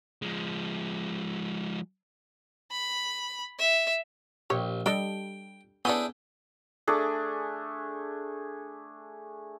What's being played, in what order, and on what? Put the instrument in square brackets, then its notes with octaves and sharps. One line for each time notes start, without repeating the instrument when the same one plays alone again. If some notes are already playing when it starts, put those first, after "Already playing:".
[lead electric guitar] F3 G#3
[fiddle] B5
E5
[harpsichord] A#1 [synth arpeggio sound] G4 [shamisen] C#5
[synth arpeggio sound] G3 [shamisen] D4 A4 D#5 [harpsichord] G5
[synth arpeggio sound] B3 G6 [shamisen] C#4 A4 [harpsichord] D4 E4 G#4
[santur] A3 D4 G#4